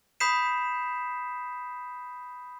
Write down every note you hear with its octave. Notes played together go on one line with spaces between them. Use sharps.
B5 D#6 G6 B6 C7 E7